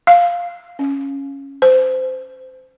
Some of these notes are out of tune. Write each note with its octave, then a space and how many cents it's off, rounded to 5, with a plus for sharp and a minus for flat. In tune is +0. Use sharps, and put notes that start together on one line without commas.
F5 +0
C#4 -5
C5 -20